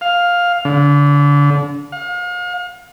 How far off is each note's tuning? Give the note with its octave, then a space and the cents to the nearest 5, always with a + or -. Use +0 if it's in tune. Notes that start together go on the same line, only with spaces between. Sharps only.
F5 +10
D3 -30
F5 +40